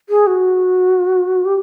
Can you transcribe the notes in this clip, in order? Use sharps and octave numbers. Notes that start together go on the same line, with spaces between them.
G#4
F#4
G4